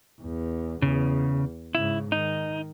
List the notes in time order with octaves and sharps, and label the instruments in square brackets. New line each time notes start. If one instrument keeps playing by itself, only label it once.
[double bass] E2
[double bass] E2 [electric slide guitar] C#3
[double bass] G#2 C#3 [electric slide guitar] E4
[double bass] D#3 [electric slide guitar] D#4